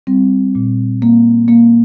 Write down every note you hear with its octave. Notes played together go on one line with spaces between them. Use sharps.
G3 C4
A#2
A#3
A#3